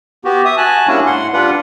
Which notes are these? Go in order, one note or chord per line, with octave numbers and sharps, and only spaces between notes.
B3 F#4 G4
E5 D#6
F#4 G#5 A5 F#6
G3 A#3 C#4 D4 E4 F#4
A2 F#5 C6
G3 D4 F4 B4 F#5